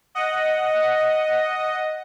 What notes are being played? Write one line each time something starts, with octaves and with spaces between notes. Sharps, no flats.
D#5 F#5